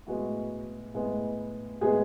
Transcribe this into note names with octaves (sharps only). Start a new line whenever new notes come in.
A2 G#3 B3 F#4
A2 G#3 B3
A2 G#3 B3 G#4